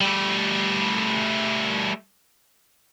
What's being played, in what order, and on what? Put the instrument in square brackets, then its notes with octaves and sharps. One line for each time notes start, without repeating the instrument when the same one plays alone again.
[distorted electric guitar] G3 A3